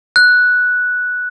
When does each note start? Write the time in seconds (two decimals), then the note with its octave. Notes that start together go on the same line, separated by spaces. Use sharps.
0.16 F#6